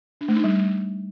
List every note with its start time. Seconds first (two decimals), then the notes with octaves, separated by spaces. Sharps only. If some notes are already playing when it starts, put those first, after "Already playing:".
0.21 D4
0.28 A3
0.36 D#4
0.44 G3